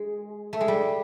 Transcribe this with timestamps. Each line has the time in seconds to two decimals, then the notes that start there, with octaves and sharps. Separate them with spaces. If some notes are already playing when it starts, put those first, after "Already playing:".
Already playing: G#3
0.53 A3
0.61 G#3
0.68 G3